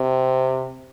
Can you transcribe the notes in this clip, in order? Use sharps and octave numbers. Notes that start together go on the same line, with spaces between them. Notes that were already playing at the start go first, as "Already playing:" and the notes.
Already playing: C3